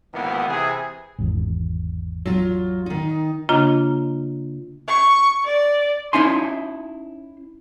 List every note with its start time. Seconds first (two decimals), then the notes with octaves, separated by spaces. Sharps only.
0.13 G#1 C#2 E3 A#3 B3
0.48 C3 E3 G#4
1.18 G#1 E2
2.26 F#3 F4
2.86 D#3 D#4
3.49 C#3 A#3 D4 F4 D#5 A#5
4.88 C#6
5.45 D5
6.13 C#4 D#4 E4 G#5 C6